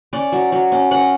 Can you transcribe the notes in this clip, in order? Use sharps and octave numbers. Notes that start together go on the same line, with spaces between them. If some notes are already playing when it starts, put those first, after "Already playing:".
C#4 D5
F#3
F#3
C#4
C#4 F#5